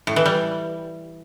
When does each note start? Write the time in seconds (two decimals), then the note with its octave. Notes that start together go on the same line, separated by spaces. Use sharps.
0.07 A2
0.16 E3
0.26 G3